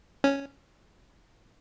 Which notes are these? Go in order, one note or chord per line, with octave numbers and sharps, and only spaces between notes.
C#4